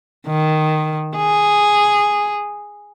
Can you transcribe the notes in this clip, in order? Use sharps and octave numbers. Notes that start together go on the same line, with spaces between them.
D#3
G#4